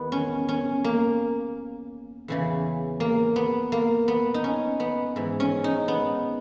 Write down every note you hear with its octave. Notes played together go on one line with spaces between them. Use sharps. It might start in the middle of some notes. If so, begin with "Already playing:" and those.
Already playing: E2 D#3 B3
C#4
C#4
A#3
E2 C#3 E3
A#3
B3
A#3
B3
D#4
C#4
B3
G#2 E3
C#4
D#4
B3